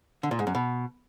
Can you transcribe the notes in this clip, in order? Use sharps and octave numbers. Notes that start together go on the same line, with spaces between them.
D3
A#2
G#2
F#2
B2